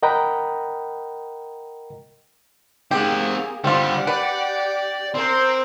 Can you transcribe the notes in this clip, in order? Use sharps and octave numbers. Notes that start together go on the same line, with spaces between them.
A#4 D#5 F#5 G5 A#5 B5
A#3 C4 G4 G#4 F#5
D3 G3 C4 F4 G4 F#5
B4 D5
C4 A#4 C5